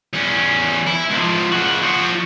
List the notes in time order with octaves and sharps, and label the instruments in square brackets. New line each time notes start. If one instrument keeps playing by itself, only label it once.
[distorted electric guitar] E2 C#4
E4
C#2 F3
C#3 F#4
F3 F#4